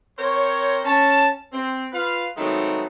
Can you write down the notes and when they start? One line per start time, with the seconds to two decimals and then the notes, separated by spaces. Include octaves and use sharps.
0.19 C4 A#4 C5 C#5
0.85 C#4 A5
1.53 C4
1.92 F4 B4 F5
2.37 D#3 F#3 G#3 A3 B3 C4